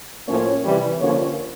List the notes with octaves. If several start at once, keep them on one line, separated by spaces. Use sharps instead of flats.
A2 F3 A#3 C#4 C#5
C3 E3 G3
D3 F3 A#3 C#4 C#5